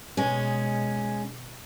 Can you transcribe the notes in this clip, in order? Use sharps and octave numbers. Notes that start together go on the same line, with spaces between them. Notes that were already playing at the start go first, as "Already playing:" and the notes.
B2 G#3 C#4